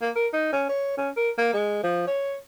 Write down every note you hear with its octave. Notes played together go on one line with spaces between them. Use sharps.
A#3
A#4
D#4
C#4
C#5
C#4
A#4
A#3
G#3
F3
C#5